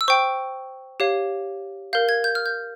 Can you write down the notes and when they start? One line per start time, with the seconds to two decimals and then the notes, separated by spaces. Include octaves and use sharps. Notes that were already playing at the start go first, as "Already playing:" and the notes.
0.01 E6
0.08 C5 G5 C#6
1.00 G4 C#5 F5
1.93 A#4 F5 G6
2.09 G#6
2.24 G6
2.35 F6
2.46 G6